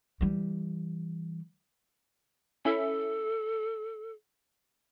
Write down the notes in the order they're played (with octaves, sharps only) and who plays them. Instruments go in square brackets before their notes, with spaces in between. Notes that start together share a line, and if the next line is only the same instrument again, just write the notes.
[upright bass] E3 G3
[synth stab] C#4 E4 E5 [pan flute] A4